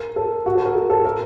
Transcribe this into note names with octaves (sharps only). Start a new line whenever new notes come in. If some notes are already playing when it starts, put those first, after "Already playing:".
Already playing: A#4
A4
F#4
A4
A#4
A4
A4
A#4